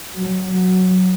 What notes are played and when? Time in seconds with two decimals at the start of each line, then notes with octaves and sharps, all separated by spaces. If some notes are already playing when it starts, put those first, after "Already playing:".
0.16 F#3
0.54 F#3